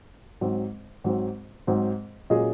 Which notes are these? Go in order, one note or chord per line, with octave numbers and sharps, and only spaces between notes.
G#2 F#3 C4
G#2 F#3 C4
G#2 F#3 C4
A#2 F#3 C#4 G#4 D#5